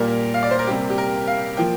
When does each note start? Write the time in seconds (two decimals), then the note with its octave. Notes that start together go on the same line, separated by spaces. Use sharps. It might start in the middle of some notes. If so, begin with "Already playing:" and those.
Already playing: A#2 G3 A#3 A#4
0.34 F5
0.43 D5
0.51 C5
0.59 A#4
0.67 C3 G3 A#3 G4
0.90 G4
0.98 A#4
1.28 F5
1.57 F3 A#3 G5